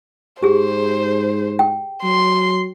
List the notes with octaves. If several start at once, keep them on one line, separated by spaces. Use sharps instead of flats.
G#2 G4 G#4 C5
G5
F#3 C6